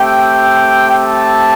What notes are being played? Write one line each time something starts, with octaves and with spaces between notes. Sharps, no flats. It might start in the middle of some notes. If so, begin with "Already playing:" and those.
Already playing: A3 C4 G4 G5
A5